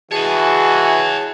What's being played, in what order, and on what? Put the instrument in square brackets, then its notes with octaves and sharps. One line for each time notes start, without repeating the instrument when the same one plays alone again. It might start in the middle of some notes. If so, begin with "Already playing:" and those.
[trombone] E3 [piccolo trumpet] F#4 [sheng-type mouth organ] G#4 A5 [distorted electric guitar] C#5 D#5